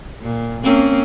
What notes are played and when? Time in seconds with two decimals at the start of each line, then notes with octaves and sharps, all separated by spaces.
0.22 A#2
0.63 A#3 C4 C#4